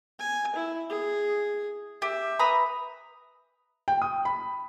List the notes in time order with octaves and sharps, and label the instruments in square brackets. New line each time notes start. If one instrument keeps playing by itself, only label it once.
[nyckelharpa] G#5
E4
G#4
[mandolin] G4 [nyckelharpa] E5
[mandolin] B4 A#5 D#6
[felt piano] G5
D#6
B5